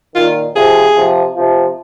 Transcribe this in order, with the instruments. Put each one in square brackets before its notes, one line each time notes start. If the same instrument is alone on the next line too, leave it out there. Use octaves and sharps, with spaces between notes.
[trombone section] A#2 D#3 [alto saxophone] F4
[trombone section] C3 F3 [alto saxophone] G#4
[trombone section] C3 F3
C3 F3